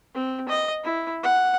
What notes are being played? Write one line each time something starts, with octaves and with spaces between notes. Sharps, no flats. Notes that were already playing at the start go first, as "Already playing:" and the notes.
C4
D#5
E4
F#5